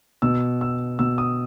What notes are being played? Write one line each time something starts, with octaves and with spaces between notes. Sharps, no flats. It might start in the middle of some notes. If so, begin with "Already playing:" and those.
B2 E6
E6
B2 E6
D#6